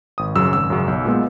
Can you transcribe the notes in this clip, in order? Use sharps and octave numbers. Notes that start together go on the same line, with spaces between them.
G#1 D#6
F#2 C#3 F#3 E6
G#1 E6
F#2 C#3 F#3
B1
A#2 G#3 B3